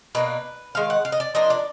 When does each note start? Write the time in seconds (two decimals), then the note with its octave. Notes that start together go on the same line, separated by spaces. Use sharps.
0.15 B2 A#3 D4 B4
0.75 D#3 G#3 F5
0.90 F#5
1.05 F5
1.12 D#5
1.20 D5
1.35 F3 A#3 D4 D#5
1.50 D5